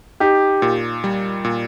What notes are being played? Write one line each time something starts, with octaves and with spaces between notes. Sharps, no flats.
D#4 G4
A#2
G3
A#2